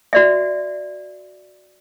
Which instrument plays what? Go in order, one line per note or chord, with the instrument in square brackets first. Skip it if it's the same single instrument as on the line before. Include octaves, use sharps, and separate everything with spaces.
[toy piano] F#4 D5 E5